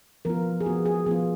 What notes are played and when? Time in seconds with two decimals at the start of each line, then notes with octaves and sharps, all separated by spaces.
0.25 F3 B3 F4 A#4
0.61 G#4
0.66 F3 B3 F4 F#4
0.86 G#4
1.06 F3 B3 F4 G#4